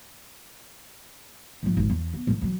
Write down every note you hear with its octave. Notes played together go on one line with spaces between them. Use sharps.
G#2 F3
G#1
E2
B3
A2 E3
E3 F#3